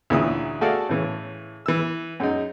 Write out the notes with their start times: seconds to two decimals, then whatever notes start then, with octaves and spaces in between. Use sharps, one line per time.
0.10 D2 A#2 C#3 E3 E4 D#6
0.61 A3 F#4 G#4 A4 D5 F5
0.89 A2 C#3 E3
1.66 E3 E6
2.20 F#2 G#3 D#4